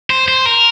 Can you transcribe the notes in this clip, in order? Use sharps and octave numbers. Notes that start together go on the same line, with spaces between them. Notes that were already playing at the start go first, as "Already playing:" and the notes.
C5
C5
A#4